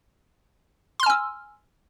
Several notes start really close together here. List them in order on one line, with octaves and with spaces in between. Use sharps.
C6 F6 G#5 E6